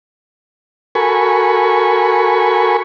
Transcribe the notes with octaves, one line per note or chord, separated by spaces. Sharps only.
F#4 A4 A#4 G#5 B5 C#6